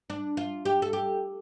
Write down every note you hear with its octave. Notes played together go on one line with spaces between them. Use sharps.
D4
F4
G4
A4
G4